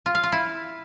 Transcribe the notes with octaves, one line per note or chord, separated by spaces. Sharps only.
F4
F5
F4
E4